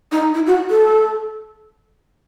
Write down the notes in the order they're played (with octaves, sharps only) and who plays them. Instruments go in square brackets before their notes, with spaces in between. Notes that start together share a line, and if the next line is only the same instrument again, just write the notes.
[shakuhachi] D#4
E4
F#4
A4